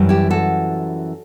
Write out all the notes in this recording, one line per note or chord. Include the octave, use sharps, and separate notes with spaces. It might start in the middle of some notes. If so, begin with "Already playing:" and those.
Already playing: F#2 E3 G3
E4 G4
F#4 A4